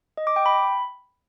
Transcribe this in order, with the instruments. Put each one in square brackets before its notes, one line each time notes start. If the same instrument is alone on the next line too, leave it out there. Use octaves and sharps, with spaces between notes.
[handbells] D#5
D6
G5
B5